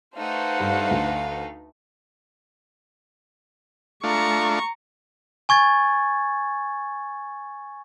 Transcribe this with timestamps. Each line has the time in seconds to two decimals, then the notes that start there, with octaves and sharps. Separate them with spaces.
0.16 A3 D#4 B4 C5 F5 F#5
0.60 G2
0.91 D2
4.04 A3 D4 F4 A#5 C#6
5.49 G#5 C#6 G#6 A6